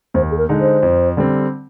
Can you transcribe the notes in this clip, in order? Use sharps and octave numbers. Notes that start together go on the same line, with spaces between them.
D#2 C5
G#4
A#4
D3 G#3 D#4
C5
F2
D3 G3 C4